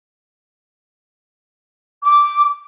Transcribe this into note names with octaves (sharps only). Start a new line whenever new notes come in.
D6